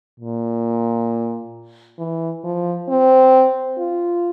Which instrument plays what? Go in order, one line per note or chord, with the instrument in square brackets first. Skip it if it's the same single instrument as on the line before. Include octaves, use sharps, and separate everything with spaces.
[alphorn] A#2
E3
F3
C4
F4